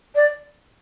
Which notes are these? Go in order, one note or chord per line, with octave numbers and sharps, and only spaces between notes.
D5